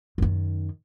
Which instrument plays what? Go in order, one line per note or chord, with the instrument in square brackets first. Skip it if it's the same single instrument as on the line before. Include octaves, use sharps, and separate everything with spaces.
[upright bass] F#2 D#3